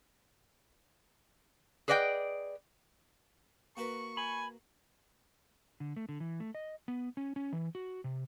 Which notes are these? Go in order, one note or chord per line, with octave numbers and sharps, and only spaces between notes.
G#4 B4 D5 D#5 F#5 G5
A#3 F#4 B4 C#6
G#5 B5
D3
A3
D3
E3
A3
D#5
B3
C#4
C#4
E3
F#4
C3